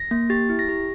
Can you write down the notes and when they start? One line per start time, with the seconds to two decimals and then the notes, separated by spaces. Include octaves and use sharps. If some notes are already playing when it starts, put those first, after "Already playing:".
Already playing: A#6
0.11 A#3
0.30 G4 A6
0.49 E4
0.59 A#6
0.69 G4